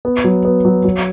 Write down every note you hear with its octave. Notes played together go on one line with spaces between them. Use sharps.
B3
F#3
B3
F#3
F#3